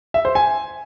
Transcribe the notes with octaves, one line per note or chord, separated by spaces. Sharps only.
E5
C5
G#5